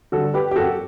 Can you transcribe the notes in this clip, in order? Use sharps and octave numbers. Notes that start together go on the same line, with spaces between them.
D3 G3 F#4 A4
G4 B4
G4
F#2 F#4 A4